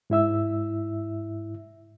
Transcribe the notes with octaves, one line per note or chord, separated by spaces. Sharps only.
G#2 E4 E5 E6